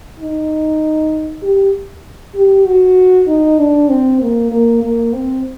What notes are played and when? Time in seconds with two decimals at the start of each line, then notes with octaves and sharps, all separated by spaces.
0.20 D#4
1.42 G4
2.35 G4
2.67 F#4
3.28 D#4
3.59 D4
3.89 C4
4.21 A#3
4.52 A#3
4.83 A#3
5.13 C4